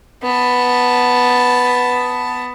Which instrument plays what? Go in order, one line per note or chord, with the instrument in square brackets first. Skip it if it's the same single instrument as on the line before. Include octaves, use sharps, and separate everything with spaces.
[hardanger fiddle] B3 A5